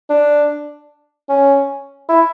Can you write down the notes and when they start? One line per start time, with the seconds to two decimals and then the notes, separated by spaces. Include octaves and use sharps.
0.09 D4
1.29 C#4
2.09 E4